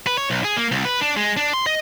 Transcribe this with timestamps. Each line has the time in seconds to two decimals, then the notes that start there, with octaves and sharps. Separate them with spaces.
0.07 B4
0.18 C#5
0.30 B1
0.44 G#4
0.57 A#3
0.72 C2
0.85 B4
1.01 D4
1.17 G#3
1.37 D4
1.53 C6
1.66 D#5